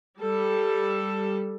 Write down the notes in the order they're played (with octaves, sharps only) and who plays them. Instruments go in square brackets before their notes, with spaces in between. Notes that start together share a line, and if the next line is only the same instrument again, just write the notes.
[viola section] G3 A4